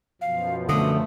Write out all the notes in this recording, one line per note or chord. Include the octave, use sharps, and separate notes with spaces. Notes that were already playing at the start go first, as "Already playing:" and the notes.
F#2 B2 F3 F5
D3 A3 D#6